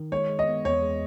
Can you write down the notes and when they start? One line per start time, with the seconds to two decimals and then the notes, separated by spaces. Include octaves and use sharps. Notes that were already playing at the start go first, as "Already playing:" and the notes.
Already playing: D#3
0.12 G#3 C#5
0.29 G#3
0.39 D#5
0.48 B3
0.65 E2 C#5
0.82 G#3